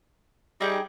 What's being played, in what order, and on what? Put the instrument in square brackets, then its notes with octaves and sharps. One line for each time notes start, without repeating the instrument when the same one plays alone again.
[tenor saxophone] G3 [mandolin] D#4 G#4 G5